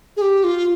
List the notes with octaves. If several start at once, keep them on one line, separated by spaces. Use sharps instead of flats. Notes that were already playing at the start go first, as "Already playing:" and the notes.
G#4
G4
F4